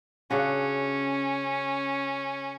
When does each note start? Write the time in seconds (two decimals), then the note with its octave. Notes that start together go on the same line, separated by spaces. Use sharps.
0.31 C#3 C#4 D4 F#4